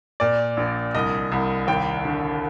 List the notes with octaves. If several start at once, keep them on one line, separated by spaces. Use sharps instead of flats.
A#2 D5
A#1
C2 D#5
C2
D#2 G5
D3